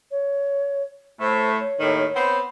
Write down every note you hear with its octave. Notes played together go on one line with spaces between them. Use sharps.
C#5
A2 A3 C5
C#5
D#2 A2 D#3
B3 C4 C5